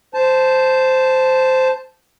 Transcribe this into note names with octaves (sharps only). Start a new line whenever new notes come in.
C5 A5